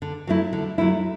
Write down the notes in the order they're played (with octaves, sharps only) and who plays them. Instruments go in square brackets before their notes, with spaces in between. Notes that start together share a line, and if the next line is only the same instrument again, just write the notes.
[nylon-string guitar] D3
F#3 A3 E4
D3
F#3 A3 E4